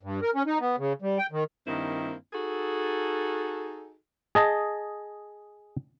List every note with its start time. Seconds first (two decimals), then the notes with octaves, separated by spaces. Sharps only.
0.03 G2
0.22 A#4
0.35 C#4
0.46 D#4
0.60 B3
0.78 C#3
1.02 G3
1.18 G5
1.32 D#3
1.67 G2 D#3 A#3 C4 E4
2.33 D#4 F#4 G#4 A4
4.35 G#4 D#5 A5